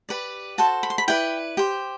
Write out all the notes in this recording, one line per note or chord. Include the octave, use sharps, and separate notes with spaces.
G4 B4 D5
F#4 A4 C5 A5
B5
C6
B5
E4 B4 D5 G5
G4 C5